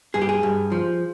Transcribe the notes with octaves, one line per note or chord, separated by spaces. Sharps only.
G2 G#4
G4
G#4
G2
F3